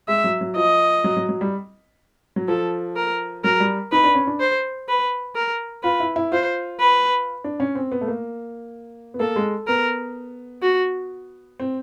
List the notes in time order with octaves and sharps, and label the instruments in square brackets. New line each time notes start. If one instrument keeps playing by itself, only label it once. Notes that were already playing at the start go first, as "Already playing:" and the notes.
[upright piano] G#3 [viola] E5
[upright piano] F#3
F#3
[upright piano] F3 [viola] D#5
[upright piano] F#3
F#3
F#3
G3
F#3
[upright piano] F3 [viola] A4
[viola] A#4
[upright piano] F#3 [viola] A#4
[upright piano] G3
[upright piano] D#4 [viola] B4
[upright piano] D4
C#4
D4
[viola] C5
B4
A#4
[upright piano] F4 [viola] B4
[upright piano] E4
E4
[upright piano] F4 [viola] C5
[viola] B4
[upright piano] D4
C#4
C4
B3
A3
A#3
B3
[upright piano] A#3 [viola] A4
[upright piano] G#3
[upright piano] B3 [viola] A#4
[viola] F#4
[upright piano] C4